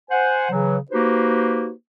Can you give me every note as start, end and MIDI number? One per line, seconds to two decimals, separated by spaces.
0.10 0.48 72
0.10 0.48 78
0.10 0.48 80
0.51 0.77 49
0.51 0.77 52
0.51 0.77 54
0.91 1.71 58
0.91 1.71 63
0.91 1.71 66
0.91 1.71 67
0.91 1.71 71
0.91 1.71 72